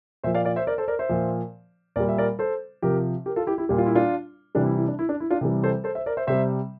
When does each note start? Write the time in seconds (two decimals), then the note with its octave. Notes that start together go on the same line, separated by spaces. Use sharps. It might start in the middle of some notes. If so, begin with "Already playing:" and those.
0.23 A#2 F3 C5 E5
0.35 D5 F5
0.45 D5 F5
0.56 C5 E5
0.67 A#4 D5
0.78 A4 C5
0.88 A#4 D5
0.99 C5 E5
1.09 A#2 F3
1.96 A#2 G3 A#4 D5
2.09 E5
2.18 A#4 D5
2.39 A4 C5
2.82 C3 F3 G4 A#4
3.26 G4 A#4
3.36 F4 A4
3.47 E4 G4
3.58 E4 G4
3.69 A#2 G3 G4
3.78 F4
3.86 E4
3.95 D4 F4
4.55 C3 E3 G3 D4
4.66 E4
4.76 E4
4.88 D4
4.99 E4
5.09 D4
5.20 E4
5.31 D4 F4
5.41 C3 E3 G3
5.63 A4 C5
5.84 A4 C5
5.95 C5 E5
6.06 A#4 D5
6.17 C5 E5
6.27 C3 G3 C5 E5